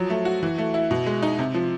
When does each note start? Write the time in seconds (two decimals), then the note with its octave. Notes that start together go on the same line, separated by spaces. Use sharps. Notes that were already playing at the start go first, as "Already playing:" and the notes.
Already playing: F3 F#3
0.10 A3
0.25 F#4
0.43 E3
0.58 A3
0.74 E4
0.91 B2
1.06 G#3
1.22 D#4
1.39 C3
1.54 F3